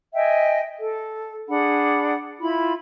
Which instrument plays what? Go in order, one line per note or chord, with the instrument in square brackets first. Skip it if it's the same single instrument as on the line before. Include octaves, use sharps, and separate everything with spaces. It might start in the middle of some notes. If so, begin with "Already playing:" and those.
[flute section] D#5 E5 G5 G#5
A4
D4 G#4 F#5 B5
E4 F4 B5